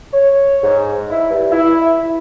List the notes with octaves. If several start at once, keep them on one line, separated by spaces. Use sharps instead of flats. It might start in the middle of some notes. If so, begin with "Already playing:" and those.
C#5
G#2
E4
G2
E4